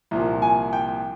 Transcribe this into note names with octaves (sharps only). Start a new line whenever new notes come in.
C2 A#2 F3
G#5
G5